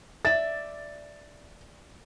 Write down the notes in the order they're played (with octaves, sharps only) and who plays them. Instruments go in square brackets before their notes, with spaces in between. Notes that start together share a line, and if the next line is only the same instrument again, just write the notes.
[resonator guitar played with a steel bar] D5 E5 [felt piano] A6